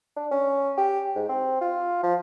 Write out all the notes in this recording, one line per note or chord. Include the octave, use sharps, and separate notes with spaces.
D4
C#4
G4
G#2
C4
F4
F3